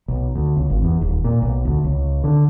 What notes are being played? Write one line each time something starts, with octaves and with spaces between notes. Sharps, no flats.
B1
D2
C#2
G#1
E2
D#1
A#2
B1
D2
C#2
D3